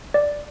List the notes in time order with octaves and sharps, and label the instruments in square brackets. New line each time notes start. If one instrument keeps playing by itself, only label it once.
[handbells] D5